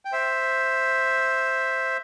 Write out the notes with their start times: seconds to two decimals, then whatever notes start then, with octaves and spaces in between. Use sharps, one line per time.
0.05 G5
0.12 C5 E5